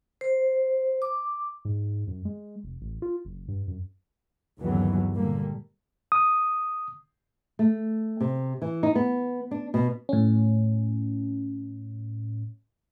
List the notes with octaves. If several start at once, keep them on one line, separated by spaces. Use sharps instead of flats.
C5
D6
G#2
F#2
G#3
F1
A1
F4
F#1
G2
F#2
G1 D#2 C#3 E3 F#3 B3
A#2 D3 G3 A#3
D#6
A3
C3
E3
D#4
B3
D4
B2
A2 C#4